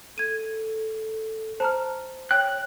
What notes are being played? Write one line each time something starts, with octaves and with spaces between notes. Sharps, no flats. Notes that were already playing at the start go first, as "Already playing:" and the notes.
A4 G#6 D#7
C5 A5 A#5 F6
C#5 G5 F#6